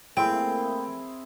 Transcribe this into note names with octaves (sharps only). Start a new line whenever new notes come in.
A3 A#3 C4 E4 G#4 C5 G5